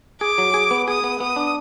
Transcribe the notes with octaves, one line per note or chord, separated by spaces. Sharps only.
G#4 D6
F#3
G#4
B3
G#4 D#6
B3
B3 D#6
D4